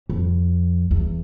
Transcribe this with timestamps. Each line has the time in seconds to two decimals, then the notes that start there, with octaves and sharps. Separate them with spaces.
0.09 F2
0.91 E2